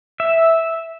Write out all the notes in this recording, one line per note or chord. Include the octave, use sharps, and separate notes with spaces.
E5